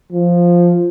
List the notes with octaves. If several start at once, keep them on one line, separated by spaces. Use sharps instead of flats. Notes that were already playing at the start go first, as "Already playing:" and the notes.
F3